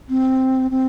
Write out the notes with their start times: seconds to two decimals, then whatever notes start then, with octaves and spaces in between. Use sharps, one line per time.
0.10 C4
0.71 C4